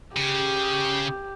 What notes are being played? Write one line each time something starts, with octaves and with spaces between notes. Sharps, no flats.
C#3 G4